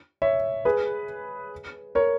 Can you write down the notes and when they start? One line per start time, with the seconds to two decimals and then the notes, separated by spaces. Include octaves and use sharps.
0.22 C#5 E5
0.65 G#4 B4
1.95 A#4 C#5